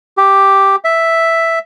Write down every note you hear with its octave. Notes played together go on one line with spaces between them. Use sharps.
G4
E5